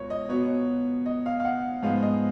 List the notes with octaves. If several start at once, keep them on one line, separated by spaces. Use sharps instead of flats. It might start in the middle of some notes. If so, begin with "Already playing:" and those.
Already playing: C#2 B2 C#5
D#5
B2 F#3 B3 C#5
D#5
F5
F5
F#5
G#2 F3 G#3 B3 F5
D#5